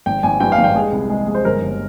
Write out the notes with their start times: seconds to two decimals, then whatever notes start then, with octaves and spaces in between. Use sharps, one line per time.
0.06 G#1 G5
0.23 G#1 G#5
0.40 G2 G5
0.52 F5
0.58 G#1
0.64 G5
0.75 G#3 G#4
0.92 C2
1.10 G#3
1.28 G#3
1.35 C5
1.45 G1 A#4
1.62 G1